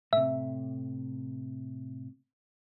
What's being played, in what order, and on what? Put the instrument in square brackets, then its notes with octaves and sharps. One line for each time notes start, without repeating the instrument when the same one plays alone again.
[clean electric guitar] A2 C3 [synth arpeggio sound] E5